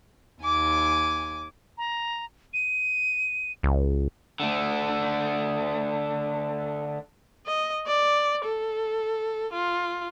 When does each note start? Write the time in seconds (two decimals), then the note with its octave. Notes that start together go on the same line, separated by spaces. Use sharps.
0.41 D#2 G#5 D6
1.78 A#5
2.54 D#7
3.63 C#2
4.40 D3 A3
7.47 D#5
7.87 D5
8.45 A4
9.53 F4